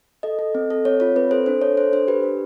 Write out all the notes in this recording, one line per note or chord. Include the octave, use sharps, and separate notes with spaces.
A4 D#5
A4
C4
A4
C4 C#5
F4 C#5
C4 B4
A4 C5
D4 C5
A4 C#5
A4 C5
D4 C5
G4 B4
D4